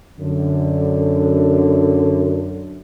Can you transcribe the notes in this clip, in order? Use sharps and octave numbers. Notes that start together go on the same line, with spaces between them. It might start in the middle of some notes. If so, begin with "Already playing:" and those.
F#2 D3